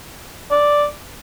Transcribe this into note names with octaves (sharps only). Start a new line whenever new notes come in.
D5